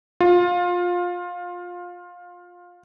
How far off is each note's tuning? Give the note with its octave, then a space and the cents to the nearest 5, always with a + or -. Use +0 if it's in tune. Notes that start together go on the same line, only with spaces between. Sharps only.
F4 +20